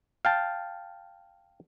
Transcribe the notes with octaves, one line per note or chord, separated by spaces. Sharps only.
F5 G5 A5